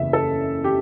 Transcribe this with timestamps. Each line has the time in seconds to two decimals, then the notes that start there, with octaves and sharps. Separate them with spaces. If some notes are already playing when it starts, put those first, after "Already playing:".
Already playing: F#1 E2 C#3 E5
0.13 A4
0.64 G4